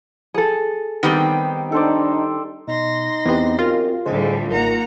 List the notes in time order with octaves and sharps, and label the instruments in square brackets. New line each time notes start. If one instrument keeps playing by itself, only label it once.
[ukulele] G#4 A4
[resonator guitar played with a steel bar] D#3 G3 C4 [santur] B3 G4
[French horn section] D4 D#4 [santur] A4 C5 D5
[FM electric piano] B2 [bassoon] D#4 [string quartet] C6 A#6
[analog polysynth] E2 B3 [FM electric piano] C4 G4
[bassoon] F#2 [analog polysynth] F4
[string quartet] D2 A2 G3 [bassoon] G#3 [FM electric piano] G#4 C5
[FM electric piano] A1 [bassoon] D#3 [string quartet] A#3 F#5 A#5